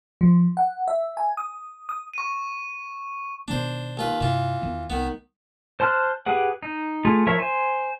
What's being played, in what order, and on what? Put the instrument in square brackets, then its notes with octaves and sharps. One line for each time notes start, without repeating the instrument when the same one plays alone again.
[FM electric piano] F3
F#5
E5
G#5
D#6
D#6
[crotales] C#6 D#7
[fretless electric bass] B2 D#3 B3 [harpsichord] D4 C5
[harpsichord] D#2 F4 B4
[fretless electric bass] G2 C3 [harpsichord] E3 F4
[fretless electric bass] E2 D#3 B3
[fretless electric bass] C2 [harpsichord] D#3 B3
[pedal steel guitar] C5 A5 C6 F6 F#6
G4 G#4 B4 F#5
D#4
A3 F4 G#4
F3 A#4 C#5 E5 C#6
C5 G#5